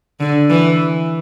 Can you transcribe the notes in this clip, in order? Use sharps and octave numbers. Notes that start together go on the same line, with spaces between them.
D3
E3